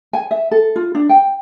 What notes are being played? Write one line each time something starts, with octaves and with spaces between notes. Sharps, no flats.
G#5
E5
A4
F4
D4
G5